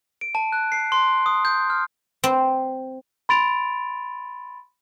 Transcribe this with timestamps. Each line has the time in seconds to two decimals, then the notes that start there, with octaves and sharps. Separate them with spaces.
0.21 D7
0.35 A5
0.52 F#6
0.72 C7
0.92 C6
1.26 D#6
1.45 G6
1.70 F6
2.24 C4
3.29 B5 C6 A6 D7 F7